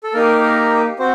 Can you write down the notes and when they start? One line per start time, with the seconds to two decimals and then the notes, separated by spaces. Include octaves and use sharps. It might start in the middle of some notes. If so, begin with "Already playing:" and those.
0.04 A4
0.14 A#3 D#4 G4 A#4
0.99 C4 F#4 C5